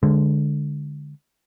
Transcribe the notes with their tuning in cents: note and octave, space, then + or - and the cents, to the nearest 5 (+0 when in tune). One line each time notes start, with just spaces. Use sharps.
D3 +0 G#3 +0